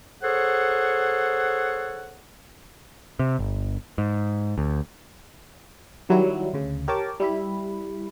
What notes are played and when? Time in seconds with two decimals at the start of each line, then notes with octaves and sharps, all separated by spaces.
0.22 G#4 A4 C5 C#5 F#5
3.19 C3
3.39 G1
3.98 G#2
4.58 D2
6.09 D#3 F#3 G3 E4
6.54 D2 C#3
6.88 G4 A#4 C#5 G5 A5 D6
7.20 G3 E4 B5